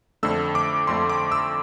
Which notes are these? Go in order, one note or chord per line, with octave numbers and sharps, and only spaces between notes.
F2 D3 A3 E6
D6
F2 D3 A3 C6
D6
E6